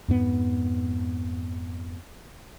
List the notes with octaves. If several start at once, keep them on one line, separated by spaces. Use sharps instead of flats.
F2 G#2 B3